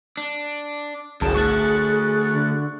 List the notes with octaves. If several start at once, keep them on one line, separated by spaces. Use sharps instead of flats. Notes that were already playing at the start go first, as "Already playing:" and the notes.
D4
G1 C2 F#2 G#4 A5
D2 C#6 F#6 A6
D3